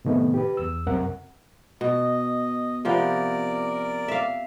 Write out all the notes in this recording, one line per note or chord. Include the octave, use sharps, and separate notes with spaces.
A2 C3 D#3 A3 B3
G4 B4
E2 E6
C2 F#2 C3 A#4 F#5
B2 D#5
C3 F3 B3 A#4 D5
E5 F5